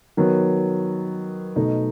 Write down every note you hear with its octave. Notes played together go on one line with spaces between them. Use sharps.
D#3 F#3 B3 F#4
B2 A3 D#4